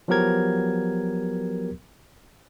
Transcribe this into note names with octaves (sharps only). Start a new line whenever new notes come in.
F3 F#3 B3 G4 A#4 G#6